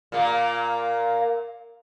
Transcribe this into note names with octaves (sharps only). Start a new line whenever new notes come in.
A#2 A#3